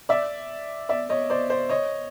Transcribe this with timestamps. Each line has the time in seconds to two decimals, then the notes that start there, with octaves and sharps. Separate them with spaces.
0.09 D5 E5
0.89 D5 E5
1.09 C#5 D#5
1.30 C5 D5
1.50 C5 D5
1.69 C#5 D#5